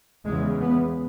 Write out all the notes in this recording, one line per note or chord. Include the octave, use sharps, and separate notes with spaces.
E2 C#3 G#3
B3